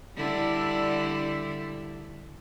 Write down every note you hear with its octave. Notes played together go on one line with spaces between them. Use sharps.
D3 G3 E4